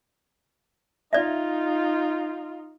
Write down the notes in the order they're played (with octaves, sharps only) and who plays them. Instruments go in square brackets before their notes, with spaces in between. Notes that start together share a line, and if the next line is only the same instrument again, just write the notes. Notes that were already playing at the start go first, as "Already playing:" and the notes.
[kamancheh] D#4 F4 [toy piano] D5 E5